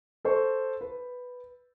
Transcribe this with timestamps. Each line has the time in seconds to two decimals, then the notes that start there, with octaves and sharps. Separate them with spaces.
0.25 A4 C5 C#6
0.81 B4